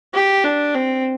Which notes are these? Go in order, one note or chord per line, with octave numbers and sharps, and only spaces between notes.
G4
D4
C4